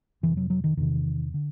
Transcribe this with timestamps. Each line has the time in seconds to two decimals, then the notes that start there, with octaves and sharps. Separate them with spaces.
0.23 F2 C3 E3
0.37 F#3
0.50 F#3
0.64 D#3
0.77 E2 C3 D#3
1.34 D3